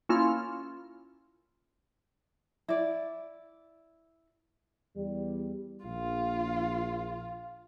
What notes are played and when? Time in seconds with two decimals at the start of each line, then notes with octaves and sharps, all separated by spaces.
0.09 A#3 C#4 E4 F4 F6
2.68 E4 D5
4.95 E2 G3
5.84 A#1 F4